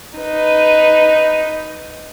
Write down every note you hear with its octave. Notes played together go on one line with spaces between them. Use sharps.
D#4 B4